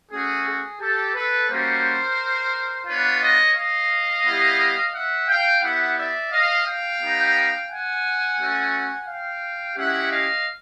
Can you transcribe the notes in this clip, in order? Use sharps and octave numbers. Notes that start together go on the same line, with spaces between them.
A3 C#4 F#4 G#4
G#4
G4 A4
A4 B4
G3 A#3 C#4 F#4 A#4 C5
B3 D4 F4 B4 C#5
C#5 D#5
D#5 F5
G3 B3 E4 G4
E5 F#5
F5 G5
B3 E4 G4 E5 F#5
D5 E5
D#5 F5
F5 G5
B3 D#4 G4
F#5 G#5
A3 C#4 F#4
F5 G5
G#3 C#4 E4 G4 E5 F#5
D#5 F5